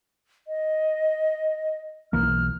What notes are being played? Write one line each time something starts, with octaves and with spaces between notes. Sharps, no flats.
D#5
B1 E3 A#3 F6